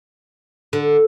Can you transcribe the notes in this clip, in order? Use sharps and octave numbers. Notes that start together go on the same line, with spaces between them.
D3